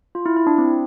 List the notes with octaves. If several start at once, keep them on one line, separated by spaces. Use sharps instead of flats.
F4
E4
E4
D4
C4